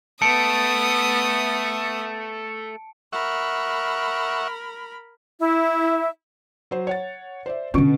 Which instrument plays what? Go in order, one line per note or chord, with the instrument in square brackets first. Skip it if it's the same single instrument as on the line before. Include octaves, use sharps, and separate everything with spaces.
[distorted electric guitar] A3 [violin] B3 D#6 [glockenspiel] A5 C#7 D7
[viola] A#4 B5 [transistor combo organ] E5 F#5 C#6
[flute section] E4 E5
[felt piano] F#3 C5
C#5 F#5 A6
C5 D5 E5
[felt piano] B2 C#6 D7 [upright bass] D3 C#4